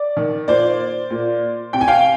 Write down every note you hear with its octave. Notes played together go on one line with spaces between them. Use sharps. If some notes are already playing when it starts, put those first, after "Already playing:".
Already playing: D5
D#3
A#2 C5 D5
A#2
C3 G5
G#5
F5 G5